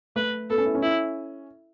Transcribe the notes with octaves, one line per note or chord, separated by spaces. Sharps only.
A3 B4
B3 A4
C#4
E4
C#4
E4